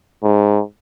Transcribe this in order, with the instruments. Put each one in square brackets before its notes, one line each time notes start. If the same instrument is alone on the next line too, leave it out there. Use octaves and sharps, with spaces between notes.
[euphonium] G#2